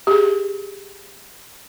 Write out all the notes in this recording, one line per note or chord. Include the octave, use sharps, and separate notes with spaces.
G4 G#4